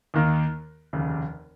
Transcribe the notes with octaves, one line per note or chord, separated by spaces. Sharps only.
D#2 D#3 A#3
F1 D#2 C#3